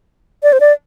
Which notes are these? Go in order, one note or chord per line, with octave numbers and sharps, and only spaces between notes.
D5
C5
D5